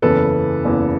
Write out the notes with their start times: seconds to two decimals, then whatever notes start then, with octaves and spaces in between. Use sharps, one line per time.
0.02 F#1 E2 C#3 E3 A4 B4
0.64 F#1 E2 C#3 E3